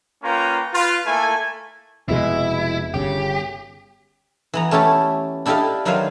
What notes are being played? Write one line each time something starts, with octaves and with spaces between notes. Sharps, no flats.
A#3 C#4 F4 B4 G5 A#5
F4 B4
A3 A#3 E4 A4 G#5
F1 B2 G#3 E4
G1 C#3 G4
E3 B3 A#5
A3 C#4 E4 G4 A4
D4 E4 G4 A4 D#5 F5
D#3 F#3 E4 B4 C5 F5